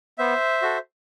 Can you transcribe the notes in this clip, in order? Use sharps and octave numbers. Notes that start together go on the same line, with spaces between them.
B3 C5 E5
F#4 A4